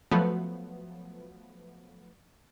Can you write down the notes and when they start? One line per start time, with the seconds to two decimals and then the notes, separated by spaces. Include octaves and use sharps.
0.11 F3 F#3 A3 B3